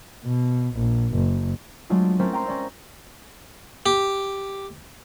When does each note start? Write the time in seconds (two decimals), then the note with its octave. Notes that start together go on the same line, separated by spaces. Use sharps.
0.25 B2
0.75 A#1
1.14 F#1
1.90 F#3 G#3 A3 D4 F4
2.19 A3 C4 C#4 A4 A#4 E5
2.33 G5 A#5 C6 A#6
2.45 C#4 D5 E6
3.86 G4